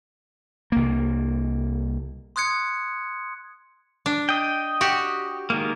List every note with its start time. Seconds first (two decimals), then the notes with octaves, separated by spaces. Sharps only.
0.72 C2 A#3
2.36 C6 D#6 F#6 G#6 C#7
4.06 D4
4.29 D#5 G5
4.81 F#4 G4
5.50 D#3 G#3 A#3